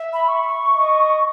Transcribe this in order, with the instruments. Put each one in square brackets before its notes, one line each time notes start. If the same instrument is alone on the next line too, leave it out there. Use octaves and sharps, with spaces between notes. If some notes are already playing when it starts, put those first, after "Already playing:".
Already playing: [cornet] E5
[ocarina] B5
C#6
[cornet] D#5